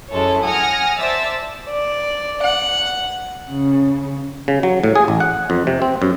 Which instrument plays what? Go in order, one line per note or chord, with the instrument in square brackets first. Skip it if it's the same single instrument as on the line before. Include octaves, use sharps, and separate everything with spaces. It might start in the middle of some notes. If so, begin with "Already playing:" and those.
[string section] F#2 G#3 E4 A4 C#5
F#5 G#5 D#6 F6 A#6 C#7
C5 D5 E5 A5 E6 A6
[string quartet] D5
F#5
C#3
[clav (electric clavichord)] C#3
F#3
A2
G#4
A1
F#5
F2
C3
C4
F#2